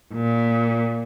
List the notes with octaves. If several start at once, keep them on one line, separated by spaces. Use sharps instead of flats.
A#2